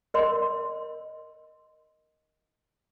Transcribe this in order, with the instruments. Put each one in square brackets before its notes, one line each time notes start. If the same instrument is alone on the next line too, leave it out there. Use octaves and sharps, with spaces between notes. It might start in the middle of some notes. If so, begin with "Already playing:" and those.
[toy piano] A#4 D#5 C6